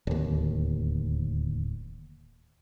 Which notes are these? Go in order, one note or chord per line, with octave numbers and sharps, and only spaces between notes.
D1 D#2